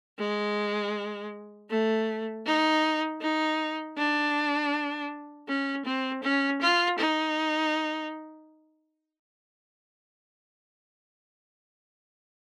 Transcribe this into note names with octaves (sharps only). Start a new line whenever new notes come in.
G#3
A3
D#4
D#4
D4
C#4
C4
C#4
F4
D#4